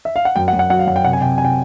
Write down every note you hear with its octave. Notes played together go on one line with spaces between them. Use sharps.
E5
F5
F#5
F#2 G5
F#5
F#2
F#5
F#3 F#5
F5
F#2 F#5
G5
C3 F#5
G#5
C3 G5
C3 G#5
G5